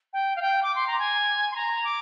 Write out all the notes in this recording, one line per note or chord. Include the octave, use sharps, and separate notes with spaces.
G5
F5
G5
D6
C6
A#5
G#5
C6
A#5
D6